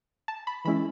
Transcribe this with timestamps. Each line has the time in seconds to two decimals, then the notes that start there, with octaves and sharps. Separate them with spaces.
0.28 A5
0.47 B5
0.65 E3 G#3 C#4 E4 B5